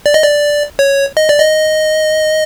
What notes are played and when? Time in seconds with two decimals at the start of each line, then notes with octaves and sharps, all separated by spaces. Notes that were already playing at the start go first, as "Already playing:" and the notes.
0.06 D5
0.14 D#5
0.23 D5
0.79 C#5
1.17 D#5
1.29 D5
1.40 D#5